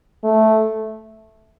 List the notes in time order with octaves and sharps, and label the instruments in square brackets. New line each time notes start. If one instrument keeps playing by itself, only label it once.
[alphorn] A3